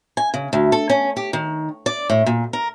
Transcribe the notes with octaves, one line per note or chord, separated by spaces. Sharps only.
G#5
C#3
D2
A4
C#4
G4
D#3
D5
A2
A#2
A#4